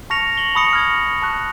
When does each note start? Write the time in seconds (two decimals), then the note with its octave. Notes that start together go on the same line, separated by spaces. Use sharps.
0.10 A5 C#6 F6 A#6 C#7 F7
0.37 F#7 G7
0.55 A5 B5 C#6 D#6 A#6 C#7
0.73 F6 G#6
1.22 A5 C#6 F#6